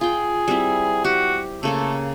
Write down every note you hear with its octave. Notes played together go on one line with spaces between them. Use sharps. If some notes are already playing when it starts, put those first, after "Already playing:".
F4 G#4 G5
G3 C4 E4
F#4 G4
C#3 A3 A#3 A4